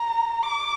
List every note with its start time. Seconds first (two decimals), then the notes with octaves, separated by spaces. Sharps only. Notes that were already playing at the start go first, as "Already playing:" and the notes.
Already playing: A#5
0.42 D6